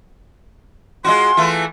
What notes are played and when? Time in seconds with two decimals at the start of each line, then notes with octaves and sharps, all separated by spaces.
1.05 G#3 F4 F#4 C6
1.37 E3 A3 F4